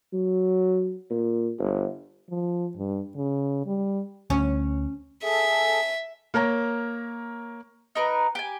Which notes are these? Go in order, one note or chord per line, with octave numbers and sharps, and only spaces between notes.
F#3
A#2
G1
F3
G2
C#3
G3
D2 C#4
G#4 A4 E5
A#3 A#4 C#5 A#5
D#4 A#4 B4
G4 G#5